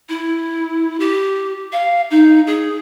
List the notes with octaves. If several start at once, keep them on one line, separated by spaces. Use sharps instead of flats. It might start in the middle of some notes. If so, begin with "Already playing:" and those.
E4
G4
F5
D#4
G#4